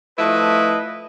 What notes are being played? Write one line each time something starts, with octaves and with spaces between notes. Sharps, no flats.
F3 A3 E4 B4 D#5